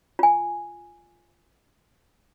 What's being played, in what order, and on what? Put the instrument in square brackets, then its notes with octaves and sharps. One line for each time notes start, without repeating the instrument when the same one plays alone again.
[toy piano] F4 G#5